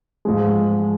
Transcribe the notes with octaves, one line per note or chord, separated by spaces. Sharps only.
G#2 F3 G#3